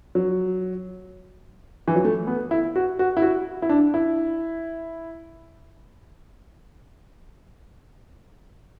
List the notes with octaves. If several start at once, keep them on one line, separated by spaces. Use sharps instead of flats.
F#3
E3
F#3
A3
B3
E4
F#4
F#4
E4
F#4
E4
D4
E4